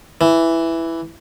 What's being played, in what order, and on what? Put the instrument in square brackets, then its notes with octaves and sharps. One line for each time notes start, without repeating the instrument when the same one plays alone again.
[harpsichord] E3